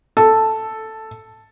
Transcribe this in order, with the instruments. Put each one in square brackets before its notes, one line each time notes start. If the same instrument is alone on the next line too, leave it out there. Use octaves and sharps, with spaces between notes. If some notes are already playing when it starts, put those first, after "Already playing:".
[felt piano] A4